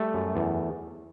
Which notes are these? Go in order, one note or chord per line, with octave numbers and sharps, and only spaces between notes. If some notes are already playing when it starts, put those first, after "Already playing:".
Already playing: G3 A3
F#2
E2